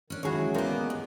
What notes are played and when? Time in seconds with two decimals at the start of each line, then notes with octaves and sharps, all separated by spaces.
0.10 D#3 C#4 D4
0.23 C#2 D#3 F#3 D#4 E4 F#4 G#4 C#5
0.54 A#2 B3 G4 A#4 D5
0.74 G#4 D#5
0.90 G2